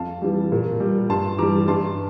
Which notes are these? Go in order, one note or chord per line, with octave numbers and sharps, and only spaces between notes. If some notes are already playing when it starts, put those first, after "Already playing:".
Already playing: F2 F5 A5
E3 G3
A#2
G3
G2 A5 C6
E3 G3 A#5 D6
G2 A5 C6